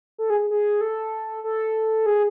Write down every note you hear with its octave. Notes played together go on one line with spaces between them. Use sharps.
A4
G#4
G#4
G#4
A4
A4
G#4